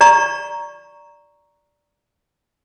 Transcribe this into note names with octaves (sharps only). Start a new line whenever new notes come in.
D5 A#5 C#6